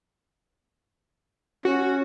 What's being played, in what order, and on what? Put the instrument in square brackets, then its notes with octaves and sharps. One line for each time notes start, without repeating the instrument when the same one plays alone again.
[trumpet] C#4 [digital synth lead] F#4